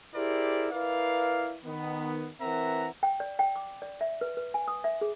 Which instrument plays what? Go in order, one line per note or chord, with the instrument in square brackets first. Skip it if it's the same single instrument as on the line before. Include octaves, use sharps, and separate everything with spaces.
[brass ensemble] E4 G4 G#4 A#4 C5 D5
E4 A#4 B4 D5 F5
D#3 B3
E3 C4 A#4 E5 F#5 A#5
[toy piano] G5
D5
G5
D6
D5
E5
B4
B4
G#5
D#6
E5
G#4